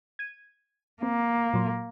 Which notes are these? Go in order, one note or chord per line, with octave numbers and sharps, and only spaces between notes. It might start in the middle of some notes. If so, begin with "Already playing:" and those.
G#6 D#7
A#3 C4
A#2 F#3 C6